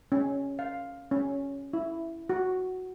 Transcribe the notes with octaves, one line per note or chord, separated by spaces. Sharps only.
C#4
F5
C#4
E4
F#4